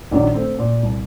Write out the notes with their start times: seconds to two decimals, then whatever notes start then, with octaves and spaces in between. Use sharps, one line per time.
0.11 A#1 D#3 F#3 D5
0.34 A3 C4
0.59 A#2
0.83 C2